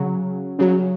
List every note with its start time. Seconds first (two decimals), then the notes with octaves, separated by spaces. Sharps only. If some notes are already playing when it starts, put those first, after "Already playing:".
Already playing: C#3 F#3
0.59 C#3 F#3